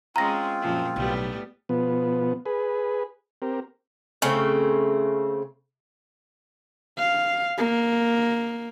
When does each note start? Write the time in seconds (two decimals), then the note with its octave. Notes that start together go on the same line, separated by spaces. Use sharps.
0.16 G#3 C4 C#4 F4 A#5 A#6
0.61 F#2 A#2 F3
0.96 B1 A2 G3 B3
1.69 B2 F3 B3
2.46 G#4 B4
3.42 C4 G4 A#4
4.22 C#3 A3 C4
6.98 F5
7.58 A#3